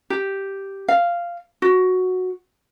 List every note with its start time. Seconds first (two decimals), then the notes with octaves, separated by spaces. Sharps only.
0.10 G4
0.88 F5
1.62 F#4